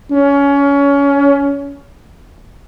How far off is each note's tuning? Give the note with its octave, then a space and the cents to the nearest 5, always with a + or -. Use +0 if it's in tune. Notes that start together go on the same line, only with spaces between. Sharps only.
C#4 +25